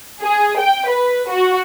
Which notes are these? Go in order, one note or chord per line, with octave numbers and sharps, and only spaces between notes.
G#4
G5
B4
F#4